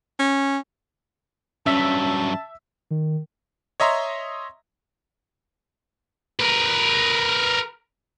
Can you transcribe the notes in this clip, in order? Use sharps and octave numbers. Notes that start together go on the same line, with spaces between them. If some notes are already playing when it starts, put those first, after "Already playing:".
C#4
G2 F#3 C#4 E5 A5 E6 B6
D#3
C#5 D#5 E5 A#5 C6
A#4 B4